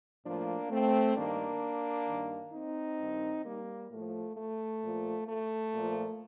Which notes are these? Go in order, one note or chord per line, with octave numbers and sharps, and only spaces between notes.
A2 F3 A#3 D4
A3 C4
G2 D#3 A#3 D4
G2 D#3
C4 D#4
G2 D#3
G3 A#3
A2 F3 A3
A3
A#2 F3
A3
A#2 F3